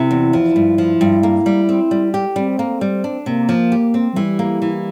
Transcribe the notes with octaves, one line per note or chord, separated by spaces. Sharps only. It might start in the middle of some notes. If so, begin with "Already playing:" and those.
Already playing: C3 E4
E2
F3
G2
F3
G2
A#3
G3
C4
G3
G4
G3 C4
A#3
G3
D4
C3 A#3
F3
G4
C4
F3
E3 G3
A#3
E3